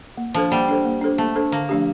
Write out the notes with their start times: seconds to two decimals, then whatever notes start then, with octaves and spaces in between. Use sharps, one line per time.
0.17 A#3
0.34 F3 D4 A4 C5
0.51 G3 A#3
0.68 D4 A4 C5
0.85 A#3
1.01 D4 A4 C5
1.18 A3 A#3
1.36 D4 A4 C5
1.52 D3 A#3
1.69 F3 A3 D4 G4